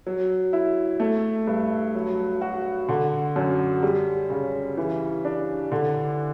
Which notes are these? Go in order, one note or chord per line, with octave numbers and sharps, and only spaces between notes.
F#3
E4
A3
G2
F#3
F#4
D3
F#2
G3
C#3
E3
D4
D3